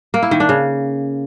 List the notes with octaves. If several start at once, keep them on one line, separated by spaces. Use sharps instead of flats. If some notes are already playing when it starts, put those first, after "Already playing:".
A#3
E4
D#3
D4
C#3